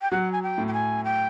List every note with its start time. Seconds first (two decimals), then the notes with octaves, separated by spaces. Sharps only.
0.02 G5
0.11 F#3 F#5
0.32 G#5
0.43 G5
0.58 A2
0.67 G5
0.73 G#5
1.04 G5